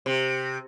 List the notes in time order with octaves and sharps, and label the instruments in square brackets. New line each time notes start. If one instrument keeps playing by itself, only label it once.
[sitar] C3